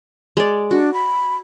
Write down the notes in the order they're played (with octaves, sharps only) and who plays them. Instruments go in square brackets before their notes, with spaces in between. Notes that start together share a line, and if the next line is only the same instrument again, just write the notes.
[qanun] G#3 D5
[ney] D4 [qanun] F#4
[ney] B5